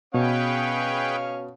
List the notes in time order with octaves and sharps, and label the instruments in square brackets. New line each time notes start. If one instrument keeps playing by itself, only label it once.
[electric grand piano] B2 [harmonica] C#4 C#5 F5 [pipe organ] G#4 B4 G5